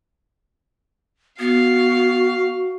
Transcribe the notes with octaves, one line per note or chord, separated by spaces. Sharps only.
B3 F#4 F5